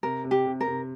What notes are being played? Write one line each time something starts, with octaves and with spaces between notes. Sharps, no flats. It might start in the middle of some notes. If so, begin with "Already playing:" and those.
C3 A#4
C3
G4
C3
A#4
C3